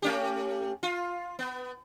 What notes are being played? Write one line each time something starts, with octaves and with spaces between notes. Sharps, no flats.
A3 C#4 G4
F4
B3